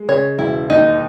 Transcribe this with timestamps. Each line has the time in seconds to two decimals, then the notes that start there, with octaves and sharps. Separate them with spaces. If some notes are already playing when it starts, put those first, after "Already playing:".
Already playing: G#3
0.08 C#3 C#5
0.38 E1 E4
0.70 D#2 D#4